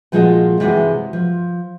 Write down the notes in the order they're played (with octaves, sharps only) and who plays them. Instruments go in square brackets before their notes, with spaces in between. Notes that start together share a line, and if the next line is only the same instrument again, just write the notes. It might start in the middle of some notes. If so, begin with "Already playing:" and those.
[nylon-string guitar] A#2 F3 G#3 F4 F#4 D#5
C3 E3 G#3 F#4
F3